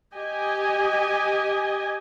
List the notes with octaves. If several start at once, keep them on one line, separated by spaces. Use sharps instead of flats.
G4 D#5 G#5